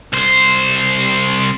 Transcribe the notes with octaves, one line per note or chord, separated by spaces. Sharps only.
C2 C5